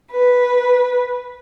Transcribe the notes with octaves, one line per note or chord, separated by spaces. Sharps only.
B4